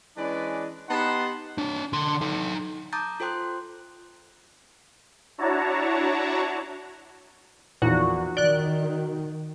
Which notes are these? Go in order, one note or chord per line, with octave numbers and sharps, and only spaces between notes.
E3 G#3 C#4 D4 B4 D5
B3 D#4 G4 F#5 A5 C6
D4 C#5
D3 C6
D#4 A4
A5 A#5 D6 D#6 G6 A6
F4 A4 C5 G5 C6 F#6
D4 E4 F#4 C#5 A5 A#5
E2 A#2 D#3 F3 F#4
D#3 D5 F#6 G7